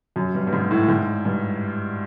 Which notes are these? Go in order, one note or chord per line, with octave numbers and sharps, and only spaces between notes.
F#2
G2
G2
G#2
A2
G#2
G2